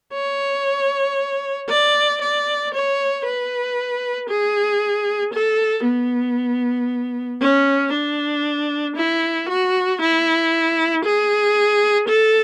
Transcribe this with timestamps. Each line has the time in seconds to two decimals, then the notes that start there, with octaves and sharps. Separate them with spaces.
0.14 C#5
1.69 D5
2.21 D5
2.74 C#5
3.25 B4
4.29 G#4
5.33 A4
5.85 B3
7.41 C#4
7.93 D4
8.97 E4
9.49 F#4
10.01 E4
11.04 G#4
12.08 A4